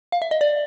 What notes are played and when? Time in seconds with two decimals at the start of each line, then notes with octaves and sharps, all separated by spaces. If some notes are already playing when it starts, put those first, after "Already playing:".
0.12 F5
0.22 E5
0.31 D#5
0.41 D5